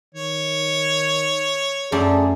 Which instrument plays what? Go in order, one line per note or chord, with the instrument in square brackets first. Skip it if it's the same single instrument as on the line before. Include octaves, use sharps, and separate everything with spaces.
[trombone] D#3 [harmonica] C#5
[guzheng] F#2 A3 D5 [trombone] G#4